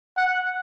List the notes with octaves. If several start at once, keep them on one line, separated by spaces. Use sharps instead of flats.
F#5